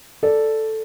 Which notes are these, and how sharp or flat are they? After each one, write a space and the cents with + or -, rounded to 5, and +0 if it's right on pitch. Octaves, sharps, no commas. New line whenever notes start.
A4 +0 D5 +0